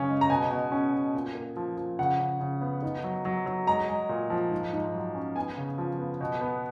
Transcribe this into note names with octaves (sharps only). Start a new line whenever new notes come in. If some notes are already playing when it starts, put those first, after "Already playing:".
Already playing: F#2 C#3 C#4
G#3
A#5
B2 G#5
B2
C#4
B2
A#2
A#3
F3
F3
C#3 F#5
C#3
C#3
B3
D#3
F#3
F#3
F#3
G#3 A#5
G#3
A#2
F3
G#2
G#2
F#3
C#4
B3 G#5
C#3
F3
B3
B2
B3